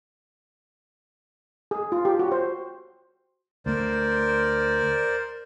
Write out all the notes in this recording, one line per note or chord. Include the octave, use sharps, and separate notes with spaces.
G#4
F4
G4
F#4
C5
D2 A3 A#4 C5 D5